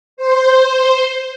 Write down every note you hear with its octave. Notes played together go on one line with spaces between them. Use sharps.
C5